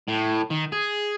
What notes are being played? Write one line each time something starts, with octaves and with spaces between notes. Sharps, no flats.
A2
D#3
G#4